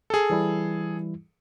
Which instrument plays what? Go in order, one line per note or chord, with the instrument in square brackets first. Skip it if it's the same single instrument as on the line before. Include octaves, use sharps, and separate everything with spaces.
[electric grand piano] G#4 A4
[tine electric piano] E3 G3 E4